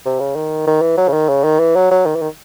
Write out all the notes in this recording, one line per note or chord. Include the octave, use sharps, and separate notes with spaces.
C3
C#3
D#3
D#3
E3
F#3
C#3
D#3
C#3
D#3
E3
F#3
F#3
D#3
E3
D#3